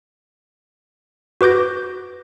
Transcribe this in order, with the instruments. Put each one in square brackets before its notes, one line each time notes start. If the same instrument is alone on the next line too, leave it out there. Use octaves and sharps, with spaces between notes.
[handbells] F#4 B4 D6 G6 A#6